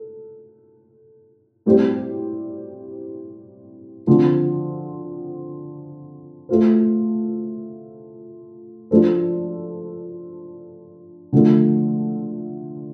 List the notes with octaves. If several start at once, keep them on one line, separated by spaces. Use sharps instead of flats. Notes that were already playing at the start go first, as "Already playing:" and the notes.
Already playing: A4
A2 G3 C4 G4 C5
D3 F3 C4
A3 F4 C5
F3 D4 A4 C5
D3 F3 A3